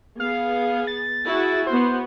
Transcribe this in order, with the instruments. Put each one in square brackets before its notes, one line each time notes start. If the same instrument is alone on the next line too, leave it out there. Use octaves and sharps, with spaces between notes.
[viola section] B3 G#4 [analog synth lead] F5
[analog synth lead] A6
[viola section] E4 F#4 G#4
[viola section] B3 F#4 [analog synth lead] C5